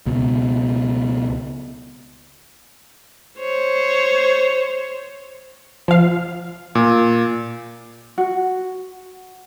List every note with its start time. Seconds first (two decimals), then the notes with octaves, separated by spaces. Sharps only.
0.06 C#2 B2
3.39 C5 C#5
5.88 F3 F5
6.75 A#2
8.18 F#4